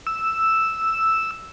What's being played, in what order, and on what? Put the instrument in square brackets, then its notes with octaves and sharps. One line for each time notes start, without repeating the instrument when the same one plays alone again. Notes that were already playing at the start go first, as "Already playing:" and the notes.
[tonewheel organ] E6